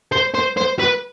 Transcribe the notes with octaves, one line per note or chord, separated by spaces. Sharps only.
C5
C5
C5
B4